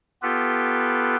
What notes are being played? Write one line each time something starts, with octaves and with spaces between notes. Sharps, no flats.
B3 F4 G4 A4 B4